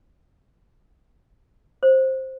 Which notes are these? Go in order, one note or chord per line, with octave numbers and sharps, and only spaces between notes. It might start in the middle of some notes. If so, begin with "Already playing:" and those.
C5